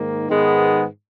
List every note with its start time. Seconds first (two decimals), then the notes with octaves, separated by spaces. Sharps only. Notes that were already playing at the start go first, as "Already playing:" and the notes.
Already playing: G#2 D#3 A#3
0.29 G#2 D#3 G#3 B3